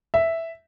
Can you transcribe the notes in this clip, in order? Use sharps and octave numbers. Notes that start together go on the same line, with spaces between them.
E5